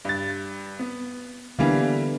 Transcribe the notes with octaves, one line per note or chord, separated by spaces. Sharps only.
G2 A6
B3
D3 E3 G3 A#3 B3 D4